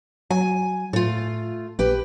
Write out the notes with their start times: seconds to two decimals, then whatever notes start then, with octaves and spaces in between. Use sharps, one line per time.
0.31 F#3 G#5
0.93 A2 A3 F4
1.79 A#1 G4 B4